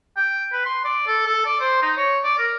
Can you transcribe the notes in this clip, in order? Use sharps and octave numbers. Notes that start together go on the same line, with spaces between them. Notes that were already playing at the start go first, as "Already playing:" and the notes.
G5
B4
C6
D5
A4
A4
D5
C5
D#4
C#5
D5
A#4